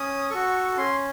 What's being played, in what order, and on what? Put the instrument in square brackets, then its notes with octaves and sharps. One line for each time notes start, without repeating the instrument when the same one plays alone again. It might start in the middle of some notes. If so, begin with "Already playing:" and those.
Already playing: [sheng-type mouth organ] C#4 D#6
F#4 A4 C#6
C#4 C6